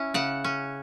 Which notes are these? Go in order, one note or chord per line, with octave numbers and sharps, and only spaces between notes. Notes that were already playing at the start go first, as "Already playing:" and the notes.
Already playing: C#4 E4
C#3 F#5
C#4